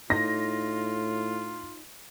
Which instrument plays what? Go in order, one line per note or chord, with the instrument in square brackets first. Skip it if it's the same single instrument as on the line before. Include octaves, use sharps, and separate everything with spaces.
[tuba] A2 [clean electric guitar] D#4 [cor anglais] F4 [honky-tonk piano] A#6